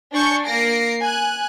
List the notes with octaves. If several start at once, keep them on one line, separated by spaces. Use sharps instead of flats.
D4 G#5 C#6 G6 C#7
A#3 A#6 C7 D7
G#5 F#6